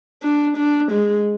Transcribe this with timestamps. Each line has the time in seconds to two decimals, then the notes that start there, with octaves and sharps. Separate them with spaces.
0.23 D4
0.57 D4
0.91 G#3